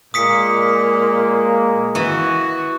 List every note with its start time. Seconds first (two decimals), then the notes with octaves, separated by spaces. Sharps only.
0.14 A#2 G#3 A#3 D#6 B6 C#7
1.95 E3 F#4